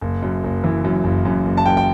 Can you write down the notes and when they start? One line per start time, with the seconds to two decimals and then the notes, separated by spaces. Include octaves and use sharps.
0.01 F#1
0.22 F#2
0.44 F#1
0.64 E3
0.84 F#2
1.04 F#1
1.25 F#2
1.45 F#1
1.57 A5
1.66 F#2 G5
1.77 G5